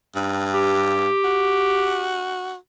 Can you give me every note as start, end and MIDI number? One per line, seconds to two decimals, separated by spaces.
0.15 1.09 43
0.54 2.17 67
1.24 2.56 66